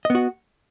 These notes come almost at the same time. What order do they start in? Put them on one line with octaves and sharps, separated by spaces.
D#5 B3 F#4